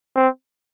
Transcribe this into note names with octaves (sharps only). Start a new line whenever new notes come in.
C4